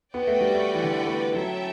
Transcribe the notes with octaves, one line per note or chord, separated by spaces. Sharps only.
B3 F#4 B4 D5 G5
A3
G3
A3
E3
D3
E3
A3
F#3 C#4 E4 A4 E5 G5